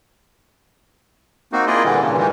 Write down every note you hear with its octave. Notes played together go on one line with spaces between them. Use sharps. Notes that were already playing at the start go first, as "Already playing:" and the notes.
A#3 C4 D#4 F#4
A#3 E4 F4 G#4 D5 D#5
A#2 D3 E3 G3
G2 A#2 C#3 E3
D#3 E3 G3 G#3